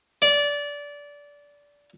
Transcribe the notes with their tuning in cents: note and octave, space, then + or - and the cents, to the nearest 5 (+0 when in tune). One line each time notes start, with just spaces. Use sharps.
D5 -20